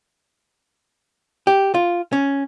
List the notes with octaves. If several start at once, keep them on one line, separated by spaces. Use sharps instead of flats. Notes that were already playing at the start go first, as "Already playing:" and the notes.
G4
F4
C#4